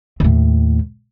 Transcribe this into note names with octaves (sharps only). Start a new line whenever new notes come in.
D#2 A2